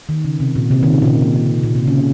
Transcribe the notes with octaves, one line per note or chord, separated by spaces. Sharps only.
D#3
C#3
C3
A#2
C3
D#3
C#3
A#2
C3
A#2
C3
C#3